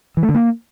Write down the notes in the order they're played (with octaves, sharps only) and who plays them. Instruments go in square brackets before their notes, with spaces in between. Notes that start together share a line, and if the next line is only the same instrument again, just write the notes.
[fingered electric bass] E3
A3
D3
A#3